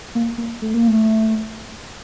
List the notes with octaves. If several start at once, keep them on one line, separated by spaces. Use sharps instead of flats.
A#3
A#3
A3
A#3
A3